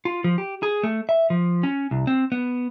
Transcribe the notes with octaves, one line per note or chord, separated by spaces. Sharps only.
F4
F3
G4
G#4
A3
E5
F3
C#4
C2
C4
B3